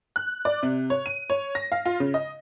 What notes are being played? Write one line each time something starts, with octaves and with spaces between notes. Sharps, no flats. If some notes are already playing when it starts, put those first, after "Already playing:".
F#6
D5
C3
C#5
D#7
C#5
A#6
F5
F4
C#3
D#5